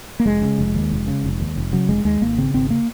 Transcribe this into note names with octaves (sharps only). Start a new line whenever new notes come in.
A#3
F1 G#3
C#3
F1
D#2
F1
C#3
F1
D#2
F1
C#3 F#3
F1 G#3
D#2 G#3
G#1 A#3
C#3 C4
G#1 C4
A#3